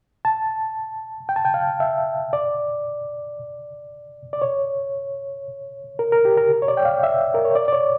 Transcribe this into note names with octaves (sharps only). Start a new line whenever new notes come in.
A5
G5
A5
G5
F5
E5
D5
D5
C#5
A#4
A#4
G4
A#4
C#5
D5
G5
F5
E5
A#4
C#5
D5
D5
C#5